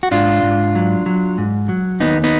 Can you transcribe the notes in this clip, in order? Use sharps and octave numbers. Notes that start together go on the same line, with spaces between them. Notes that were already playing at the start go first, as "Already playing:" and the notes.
F#4
G#2 D4 F4
G#2
F#3
F#3
G#2
F#3
D#2 B3 D#4
B3 D#4